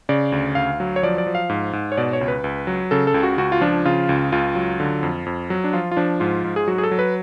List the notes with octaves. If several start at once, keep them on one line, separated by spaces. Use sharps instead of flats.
C#3 D5
D2
D2 F5
F#3
C#5
F3 D5
D5
F3
F5
G#2
G#2
C#5
B2 D5
C#5
C#2
B4
C#2
F#3
C#3 A4
A4
C#2
F#4
C#2 F#4
F4
F3 D4
C#3 F4
C#2
C#2 F4
F#3
D3
F2
F2
F#3
D4
F3 F4
F4
F3 D4
G#2 F4
G#2
G#4
F#3 F#4
G#4
A4
F#3
B4